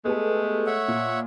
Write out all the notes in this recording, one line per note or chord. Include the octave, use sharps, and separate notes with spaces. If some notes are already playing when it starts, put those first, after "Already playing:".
G#3 A3 B3 G4 A4
C#5 E5 F#5
A#2